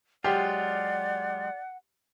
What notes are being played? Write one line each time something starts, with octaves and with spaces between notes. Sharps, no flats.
F#3 G#3 F4 G4 D5 F#5